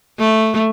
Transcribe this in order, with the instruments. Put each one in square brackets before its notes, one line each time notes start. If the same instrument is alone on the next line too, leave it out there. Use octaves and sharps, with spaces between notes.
[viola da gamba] A3